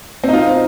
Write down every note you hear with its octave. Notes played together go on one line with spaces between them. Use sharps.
C4 D#4 F4